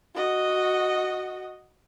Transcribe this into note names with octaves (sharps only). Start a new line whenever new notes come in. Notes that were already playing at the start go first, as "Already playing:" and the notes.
F#4 D#5